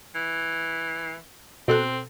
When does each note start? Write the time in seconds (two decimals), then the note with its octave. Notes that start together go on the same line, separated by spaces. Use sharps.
0.15 E3
1.68 B2 C4 A4 F#6